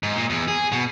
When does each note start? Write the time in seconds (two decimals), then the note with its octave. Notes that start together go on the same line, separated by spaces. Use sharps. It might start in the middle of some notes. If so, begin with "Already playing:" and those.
0.03 G#2
0.16 A#2
0.30 E2
0.48 G#4
0.72 B2